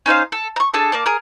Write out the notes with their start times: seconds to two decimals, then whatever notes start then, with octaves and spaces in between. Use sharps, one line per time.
0.06 C#4 D#4 C5 F5
0.32 A4
0.56 A#5 C#6
0.74 D4 G#4 A4 A5
0.92 A#3 D5 A5
1.06 G#4 A#4